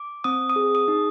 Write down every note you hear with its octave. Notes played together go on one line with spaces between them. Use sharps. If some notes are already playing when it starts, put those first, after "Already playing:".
Already playing: D6
C4 D#6
D#6
G#4
D#6
D#4